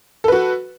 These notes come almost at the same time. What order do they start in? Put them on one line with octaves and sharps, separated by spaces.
A4 B4 F#4